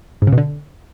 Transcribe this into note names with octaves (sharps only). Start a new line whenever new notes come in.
G#2
C#3
B2
D3